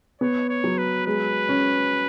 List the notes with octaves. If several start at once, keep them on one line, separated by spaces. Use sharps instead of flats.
B3 C#5
C#5
F#3
B4
G#3 B4
C#4